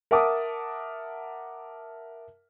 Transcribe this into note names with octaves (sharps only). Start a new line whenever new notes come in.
A#4 E5 F#5 A5 D6 D#6